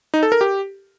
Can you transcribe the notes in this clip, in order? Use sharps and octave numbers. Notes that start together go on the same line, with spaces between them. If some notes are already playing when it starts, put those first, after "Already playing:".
D#4
A4
A#4
G4